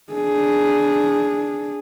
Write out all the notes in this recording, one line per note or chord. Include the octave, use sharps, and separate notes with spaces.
D4 G#4